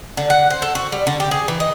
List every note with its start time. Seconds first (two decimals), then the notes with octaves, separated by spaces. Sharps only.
0.17 D3
0.30 F#5
0.50 C5
0.62 A4
0.75 F#4
0.92 G3
1.07 D3
1.20 G4
1.31 G#4
1.48 E3
1.60 D#5